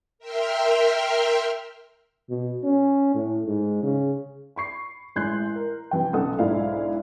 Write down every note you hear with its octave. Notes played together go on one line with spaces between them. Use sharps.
A#4 E5 G5 C6 F6
B2
C#4
A2
G#2
C#3
B5 C#6 C7
A1 G#3 C6 F#6 G6 C7
A#4
C3 E3 G5
B1 C#3 A4 F#5 D#6
B1 G#2 D4 E4 F5